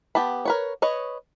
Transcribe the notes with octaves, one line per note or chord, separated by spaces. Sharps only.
B3 G4 A5 B5
A#4 B4 C#5
B4 C#5 D#5